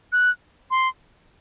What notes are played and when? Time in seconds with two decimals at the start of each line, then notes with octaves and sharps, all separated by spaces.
0.13 F#6
0.71 C6